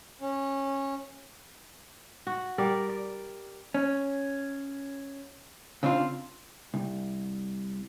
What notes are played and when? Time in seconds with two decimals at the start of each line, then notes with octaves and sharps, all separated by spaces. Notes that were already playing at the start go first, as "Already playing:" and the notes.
0.21 C#4
2.27 F#4
2.58 G3 A#4 D5
2.89 D5
3.74 C#4
5.83 C#3 C4 D4 F4
6.74 C2